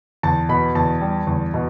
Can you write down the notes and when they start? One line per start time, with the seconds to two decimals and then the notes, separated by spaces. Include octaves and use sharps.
0.23 E2 A5
0.49 B2 B5
0.75 E2 A5
1.01 G3
1.27 E2
1.54 B2